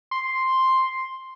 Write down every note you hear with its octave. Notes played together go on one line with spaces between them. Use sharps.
C6